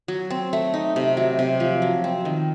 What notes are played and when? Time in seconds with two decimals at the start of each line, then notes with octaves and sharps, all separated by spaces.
0.08 F#3
0.30 C4
0.53 A3
0.74 D#4
0.96 C3
1.17 F#3
1.39 C3
1.60 F3
1.82 F#3
2.04 C4
2.25 D#3